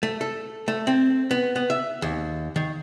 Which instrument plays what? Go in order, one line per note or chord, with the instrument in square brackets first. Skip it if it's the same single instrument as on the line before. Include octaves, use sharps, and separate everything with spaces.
[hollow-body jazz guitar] A3
A4
A3
C4
B3
B3
E5
D#2
D#3